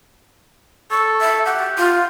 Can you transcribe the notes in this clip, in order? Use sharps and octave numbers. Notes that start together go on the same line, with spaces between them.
A4 C#6
E5
G4 F#5
F4